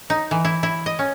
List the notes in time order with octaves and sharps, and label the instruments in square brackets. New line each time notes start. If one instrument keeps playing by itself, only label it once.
[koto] D#4
E3
E4
E4
D#5
C#4